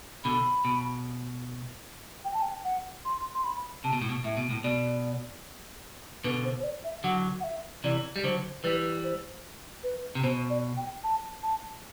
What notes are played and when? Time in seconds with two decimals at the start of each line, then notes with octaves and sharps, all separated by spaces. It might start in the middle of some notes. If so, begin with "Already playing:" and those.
0.24 B2 D3 B5
0.65 B2
2.25 G5
2.34 A5
2.42 G5
2.65 F#5
3.05 C6
3.35 C6
3.44 B5
3.84 C3 A5
3.93 B2
4.02 A2
4.09 B2
4.24 A2 E5
4.37 B2
4.50 A2
4.64 B2 D5
6.24 B2 D3 B4
6.44 C5
6.60 C5
6.63 D5
6.84 E5
7.04 D3 F#3 F#5
7.40 F#5
7.44 E5
7.84 C3 E3 D5
8.16 G3
8.24 D3 F#3 C5
8.63 E3 G3 B4
9.04 C5
9.83 B4
10.15 C3
10.23 B2 C5
10.50 D5
10.77 G5
11.04 A5
11.43 A5